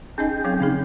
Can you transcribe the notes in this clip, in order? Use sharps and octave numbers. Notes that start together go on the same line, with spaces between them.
C#4 D#4 G#4 D#5 G5
F#3 C4 F5
C#3 C4 D#4 G#4